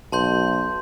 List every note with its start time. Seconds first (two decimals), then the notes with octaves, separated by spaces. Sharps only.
0.12 B1 A5 C6 G6